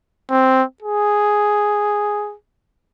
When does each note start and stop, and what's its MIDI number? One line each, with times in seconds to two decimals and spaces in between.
0.30 0.63 60
0.82 2.34 68